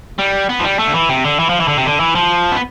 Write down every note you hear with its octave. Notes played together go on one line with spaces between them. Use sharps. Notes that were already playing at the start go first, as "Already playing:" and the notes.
G3
B3
F3
G3
A3
D3
E3
C3
D3
E3
F3
E3
D3
C3
D3
E3
F3
B3